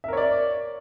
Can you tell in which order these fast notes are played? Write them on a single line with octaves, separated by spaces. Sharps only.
E5 A#4 C#5 D5